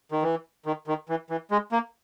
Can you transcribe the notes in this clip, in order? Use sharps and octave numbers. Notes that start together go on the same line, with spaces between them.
D#3
E3
D#3
D#3
E3
E3
G#3
A#3